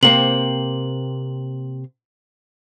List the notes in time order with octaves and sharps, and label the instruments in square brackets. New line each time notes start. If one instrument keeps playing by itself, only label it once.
[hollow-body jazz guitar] C3 A#3 C4 [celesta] F#7